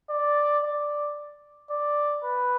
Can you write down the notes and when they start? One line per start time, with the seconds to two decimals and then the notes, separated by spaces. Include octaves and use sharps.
0.10 D5
0.63 D5
1.70 D5
2.24 B4